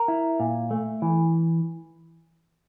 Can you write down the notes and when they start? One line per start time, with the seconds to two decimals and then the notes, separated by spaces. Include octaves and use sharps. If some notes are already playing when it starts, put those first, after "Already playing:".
Already playing: A#4
0.08 E4
0.40 A#2
0.71 A3
1.02 E3